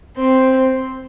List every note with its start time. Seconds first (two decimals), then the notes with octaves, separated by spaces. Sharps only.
0.16 C4